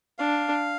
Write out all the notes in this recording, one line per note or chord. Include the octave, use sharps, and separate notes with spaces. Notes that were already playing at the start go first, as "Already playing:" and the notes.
D4 F5